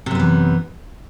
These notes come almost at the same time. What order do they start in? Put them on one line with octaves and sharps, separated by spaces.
C3 F#2 B3 E3